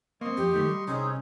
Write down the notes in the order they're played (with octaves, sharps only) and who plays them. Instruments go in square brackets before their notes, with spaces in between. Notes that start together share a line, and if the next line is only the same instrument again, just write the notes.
[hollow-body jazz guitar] A#3 C4 [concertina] D#5 C6 C#6
[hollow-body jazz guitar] F2 [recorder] G4
[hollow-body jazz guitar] D#3 A3
G3
[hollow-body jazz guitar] C2 [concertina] C4 D#4 G#4 [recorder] C#4